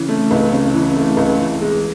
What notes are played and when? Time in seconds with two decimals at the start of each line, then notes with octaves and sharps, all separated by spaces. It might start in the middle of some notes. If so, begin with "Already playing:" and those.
Already playing: C#3 E3
0.09 A3
0.31 C#2
0.53 C#3
0.74 E3
0.96 A3
1.17 C#2
1.39 E3
1.61 G#3